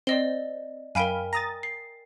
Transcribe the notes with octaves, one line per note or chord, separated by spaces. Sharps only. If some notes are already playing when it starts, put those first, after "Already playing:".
C4 D5 D#5 G7
F#2 A#4 F5 G5 G#5 B5
A#5 D#6 A6 A#6
C7